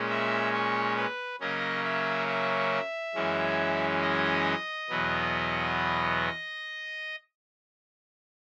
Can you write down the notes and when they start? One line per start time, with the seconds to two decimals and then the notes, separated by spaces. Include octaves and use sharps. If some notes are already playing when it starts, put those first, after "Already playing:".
Already playing: A#2 G#3 C#4
0.10 E5
0.54 C#5
0.97 B4
1.40 C#3 F#3 A#3 C#4 D#5
1.84 E5
2.28 E5
3.15 F#2 E3 G#3 C#4
4.02 D#5
4.89 E2 B2 F#3 B3